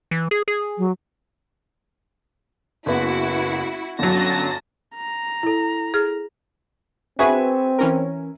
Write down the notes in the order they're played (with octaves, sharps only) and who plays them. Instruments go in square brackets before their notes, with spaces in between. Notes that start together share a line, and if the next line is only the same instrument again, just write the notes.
[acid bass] E3
G#4
G#4
[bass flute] F#3
[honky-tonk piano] F#1 B3 [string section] E4 F#4
[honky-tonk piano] G1 F#3 [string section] C#4 A5 A#6
[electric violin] A#5
[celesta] E4 A4
[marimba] G#4 F6
[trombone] C4 [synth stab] F#4 G#4 B4 [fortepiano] E5 G#5 C#6
[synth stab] E3 C#4 A#4